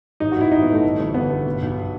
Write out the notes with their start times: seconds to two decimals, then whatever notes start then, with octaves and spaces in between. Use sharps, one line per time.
0.20 A1 D#4
0.32 F#4
0.36 A1 E4
0.52 A1 D#4
0.62 B3
0.68 A1 A3
0.84 G1
1.00 G1
1.14 G1 B3
1.30 G2
1.45 B2
1.62 B1